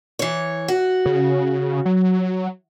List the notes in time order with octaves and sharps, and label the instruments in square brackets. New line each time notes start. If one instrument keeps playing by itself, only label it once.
[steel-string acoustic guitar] E3 C#5
F#4
[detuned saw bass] C#3
F#3